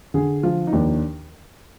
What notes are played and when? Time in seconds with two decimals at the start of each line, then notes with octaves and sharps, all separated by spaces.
0.14 D3 G#4
0.43 F3 F4
0.67 D#4
0.73 D#2 D4